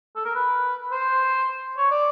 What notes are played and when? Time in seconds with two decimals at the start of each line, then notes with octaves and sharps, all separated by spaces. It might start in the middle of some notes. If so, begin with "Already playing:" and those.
0.16 A4
0.25 A#4
0.35 B4
0.92 C5
1.77 C#5
1.91 D5